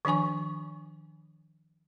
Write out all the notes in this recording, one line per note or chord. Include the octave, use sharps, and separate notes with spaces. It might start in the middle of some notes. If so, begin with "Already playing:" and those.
D#3 F3 D4 G#5 C#6